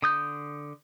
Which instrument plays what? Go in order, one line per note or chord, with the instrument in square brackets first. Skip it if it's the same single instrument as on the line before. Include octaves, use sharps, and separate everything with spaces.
[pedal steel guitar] D3 D#6 G6